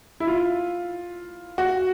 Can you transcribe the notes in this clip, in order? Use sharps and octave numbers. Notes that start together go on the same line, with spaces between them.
E4
F4
F#4